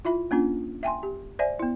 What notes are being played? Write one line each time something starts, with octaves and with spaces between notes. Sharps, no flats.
E4 F4 E5 B5
A#3 C#4 D4 F4
E5 G5 G#5 C6
G4
C5 D5 E5 G#5
B3 E4